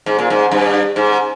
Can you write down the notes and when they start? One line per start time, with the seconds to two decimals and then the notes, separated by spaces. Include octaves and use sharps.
0.06 G#2
0.19 A#2
0.30 G#2
0.51 G2
0.96 G#2